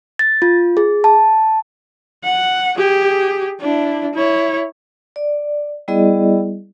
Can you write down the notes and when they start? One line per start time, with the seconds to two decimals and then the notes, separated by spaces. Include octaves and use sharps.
0.19 A6
0.42 F4
0.77 G#4
1.04 A5
2.24 F#5
2.78 G4 G#4
3.61 D4 E4
4.14 E4 C#5
5.16 D5
5.88 G3 B3 E4 G#4 D5 D#5